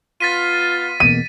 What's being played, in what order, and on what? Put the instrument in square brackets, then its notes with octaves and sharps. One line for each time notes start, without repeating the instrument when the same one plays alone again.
[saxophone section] B3 F4 [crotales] A6 B6 D#7
[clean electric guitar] E2 B2 A#3 [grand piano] D#7